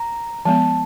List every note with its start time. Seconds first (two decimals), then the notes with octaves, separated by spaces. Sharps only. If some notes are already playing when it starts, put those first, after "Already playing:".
Already playing: A#5
0.45 F3 G#3 B3 A5